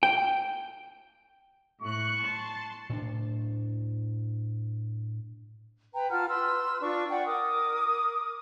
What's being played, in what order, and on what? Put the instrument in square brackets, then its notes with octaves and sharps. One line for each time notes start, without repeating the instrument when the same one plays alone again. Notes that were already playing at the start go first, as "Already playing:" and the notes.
[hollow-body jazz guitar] G5
[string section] A2 F#6 [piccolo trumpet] C#6
[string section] A5 C6
[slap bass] A2 D4
[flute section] B4 G5 A#5
F4 F#5 A5 F6
B4 C6 E6 F6
D4 F4 C#6
D5 F#5 G5 A5
A#4 D6 D#6